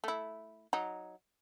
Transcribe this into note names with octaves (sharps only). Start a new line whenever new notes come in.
A3 E4
F#3 D#4